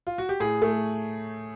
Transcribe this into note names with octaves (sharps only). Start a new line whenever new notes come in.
F4
F#4
G4
A2 G#4
A3